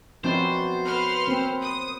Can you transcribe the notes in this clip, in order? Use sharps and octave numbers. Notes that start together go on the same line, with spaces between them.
F#2 B2 F3 C4 D#4 C5 G5
A#4 B4 F#5 B5 C6 F6
A#3 C4
D#6